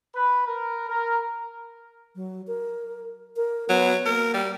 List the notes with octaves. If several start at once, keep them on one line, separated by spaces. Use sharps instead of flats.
B4
A#4
A#4
F#3
A#4
A#4
F#3 B3
A#3 A#4
G3